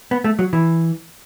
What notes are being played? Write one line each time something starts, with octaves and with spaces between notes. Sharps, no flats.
B3
A3
F#3
E3